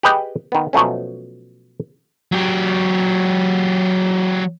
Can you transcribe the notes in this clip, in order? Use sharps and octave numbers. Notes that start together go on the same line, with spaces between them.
G4 G#4 B4 D#5 G5
D#3 B3
B2 F3 F#3 A3 C#4
F#3 G4